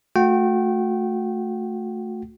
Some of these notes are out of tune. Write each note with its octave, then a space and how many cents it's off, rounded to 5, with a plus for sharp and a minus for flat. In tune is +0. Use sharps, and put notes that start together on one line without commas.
A3 +0 F#4 -35 G5 -25